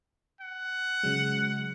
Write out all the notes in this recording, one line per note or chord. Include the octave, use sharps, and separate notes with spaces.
F#5
C#3 F#3 G#3